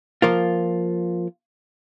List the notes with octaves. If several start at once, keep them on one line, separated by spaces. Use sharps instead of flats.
F3 A#3 F4